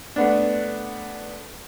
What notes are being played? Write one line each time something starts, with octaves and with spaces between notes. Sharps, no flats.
A3 B3 D4